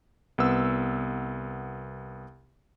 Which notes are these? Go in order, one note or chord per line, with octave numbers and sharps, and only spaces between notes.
C2 B3 E6